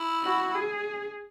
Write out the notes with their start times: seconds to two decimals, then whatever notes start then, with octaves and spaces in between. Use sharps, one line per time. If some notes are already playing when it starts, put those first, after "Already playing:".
Already playing: E4
0.23 F#4
0.55 G#4